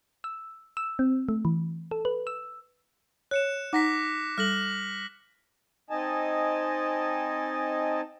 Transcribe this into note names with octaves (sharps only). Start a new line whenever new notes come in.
E6
E6
C4
A3
E3
A4
B4
E6
C#5 F#6 C#7 E7
D#4 F#5 A#5 D6 A#6 B6
G3 A4 F6 A#6 F#7
C4 D#4 D#5 G#5 A5